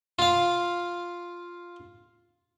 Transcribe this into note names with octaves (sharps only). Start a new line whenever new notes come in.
F4 F5